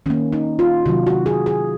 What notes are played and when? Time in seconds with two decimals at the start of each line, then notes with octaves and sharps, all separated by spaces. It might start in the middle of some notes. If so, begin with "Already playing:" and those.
0.06 D#3 C#4
0.10 A#3
0.32 D#4
0.59 F4
0.86 C3 D#3 F#3 F#4
1.07 F#4
1.26 G#4
1.46 G#4